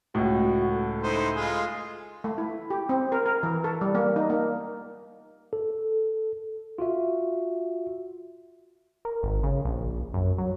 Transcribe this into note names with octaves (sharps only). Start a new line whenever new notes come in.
C#2 A2 F#4
A4
D#4 E4 C5
G#3 F4
A3
E4
G4
C4
A#4
A#4
E3
A4
G3
A#3
D#4
A#3
A4
F4 F#4 E5
A#4
G#1
C#3
A#1
F#2
F#3